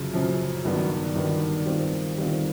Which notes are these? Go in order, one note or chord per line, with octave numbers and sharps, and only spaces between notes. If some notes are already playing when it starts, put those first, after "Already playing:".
Already playing: F#2 C#3 F3
F#2 C#3 F3
G2 D#3 F#3 B3
G2 D#3 F#3 B3
D#3 G3 C4 F4
D#3 G3 C4 F4